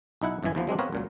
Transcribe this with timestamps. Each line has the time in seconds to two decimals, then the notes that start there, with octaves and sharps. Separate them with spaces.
0.21 B1 D#4 E4 F#5
0.43 G1 F#2 B2 E3 G#5
0.55 D#2 E3 F3 B3
0.67 F#3 G#3 C4 D4
0.79 B3 C4 A#4 B4 C#5 F5
0.92 C#2 A#2 F#3